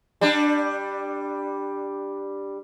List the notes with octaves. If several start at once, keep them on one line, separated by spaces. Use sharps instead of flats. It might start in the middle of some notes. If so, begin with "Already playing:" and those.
G3 D4